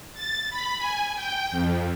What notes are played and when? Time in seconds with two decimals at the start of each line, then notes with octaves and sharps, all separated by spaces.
0.14 A6
0.50 B5
0.79 G#5
1.15 G5
1.51 F2